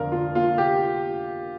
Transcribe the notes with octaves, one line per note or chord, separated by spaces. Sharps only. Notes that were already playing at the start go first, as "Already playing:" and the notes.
Already playing: F2 D3 A#4 D5 F5
F4
A#3 F4
G4